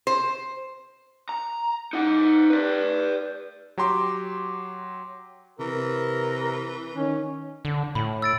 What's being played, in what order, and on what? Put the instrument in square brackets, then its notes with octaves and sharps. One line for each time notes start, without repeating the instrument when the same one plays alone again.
[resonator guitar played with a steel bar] C5
[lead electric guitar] A#5
D#4 F#5
B4 D5
[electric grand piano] F#3 G4 A#5 C6 D6
[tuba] C3 [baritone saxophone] E3 [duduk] A#4
[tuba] D#3 [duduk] C#4
[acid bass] D3
[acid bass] A2 [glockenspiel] B5
[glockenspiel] E6 A6 D7